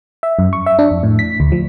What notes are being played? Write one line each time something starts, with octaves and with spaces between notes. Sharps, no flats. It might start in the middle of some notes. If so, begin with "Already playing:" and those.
E5
F#2
C#6
E5
D4
F2
A2
B6
D2
F3